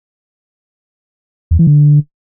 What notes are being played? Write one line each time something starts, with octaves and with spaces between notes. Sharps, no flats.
E2
E3
D3